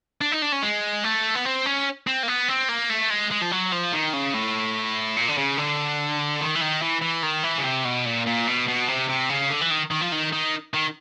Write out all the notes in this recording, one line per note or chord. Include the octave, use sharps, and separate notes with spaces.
D4
D#4
D4
C#4
G#3
A3
B3
C4
C#4
C4
A#3
B3
C4
A#3
A3
G#3
G#3
F3
F#3
F3
D#3
C#3
A2
A#2
D3
C#3
D3
D#3
E3
D#3
E3
E3
D#3
E3
C#3
C3
B2
A#2
A#2
B2
B2
C3
C3
C#3
D3
E3
D#3
D#3
F3
D#3
D#3
D#3